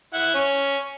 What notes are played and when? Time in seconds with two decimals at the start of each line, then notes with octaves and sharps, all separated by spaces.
0.14 E4 F#5
0.34 C#4